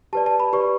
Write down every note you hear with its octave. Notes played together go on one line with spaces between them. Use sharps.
G4 B4 D5 A5
A5
B5
G4 B4 D5 C#6